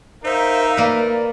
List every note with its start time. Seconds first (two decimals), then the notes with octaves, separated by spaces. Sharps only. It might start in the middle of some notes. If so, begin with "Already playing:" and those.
0.25 D#4 A#4 C5 E5 F5
0.77 A#3 B4 D5